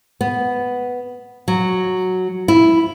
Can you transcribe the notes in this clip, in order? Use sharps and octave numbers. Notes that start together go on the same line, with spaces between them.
B3
F#3
E4